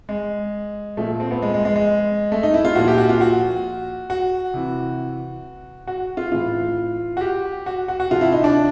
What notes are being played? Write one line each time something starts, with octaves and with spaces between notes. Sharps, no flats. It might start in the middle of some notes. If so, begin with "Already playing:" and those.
G#3
A#2 F3 A3
C4
B3
G#3
G#3
G#3
G#3
A3
D#4
E4
F4
A#2 F3 F#4
G4
F#4
F4
F#4
F#4
C3 E3
F#4
F4
A2 E3 F4
F#4
G4
F#4
F#4
F#4
C3 F3 F4
E4
D#4
D4